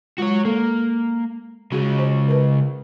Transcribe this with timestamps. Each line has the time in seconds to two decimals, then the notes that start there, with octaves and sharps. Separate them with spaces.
0.18 G#3 F4 F#4 C#5
0.45 A#3 A4
1.72 C#3 G#3 F#4 G#4
1.99 C5
2.28 A#4 B4